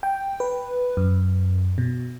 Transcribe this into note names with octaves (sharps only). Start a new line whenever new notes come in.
G5
B4
F#2
B2